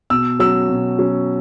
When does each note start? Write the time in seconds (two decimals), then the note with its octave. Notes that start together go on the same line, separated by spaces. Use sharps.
0.10 B2 E6
0.40 F#3 C#4 E6
0.69 B2
0.99 F#3 C#4